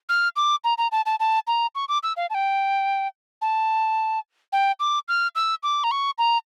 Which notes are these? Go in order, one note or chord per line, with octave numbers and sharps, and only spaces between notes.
F6
D6
A#5
A#5
A5
A5
A5
A#5
C#6
D6
E6
F5
A5
G5
A5
G5
D6
F6
E6
D6
A#5
C#6
A#5